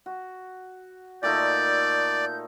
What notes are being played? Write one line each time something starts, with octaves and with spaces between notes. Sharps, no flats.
F#4
A#2 A3 D#4 D5 G6